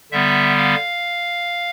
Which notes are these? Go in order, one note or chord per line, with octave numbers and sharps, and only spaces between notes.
D3 G3 B3 E5
F5